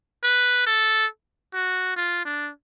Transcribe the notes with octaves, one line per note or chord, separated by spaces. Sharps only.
B4
A4
F#4
F4
D4